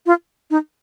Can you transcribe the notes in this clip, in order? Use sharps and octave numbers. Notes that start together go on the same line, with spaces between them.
F4
D#4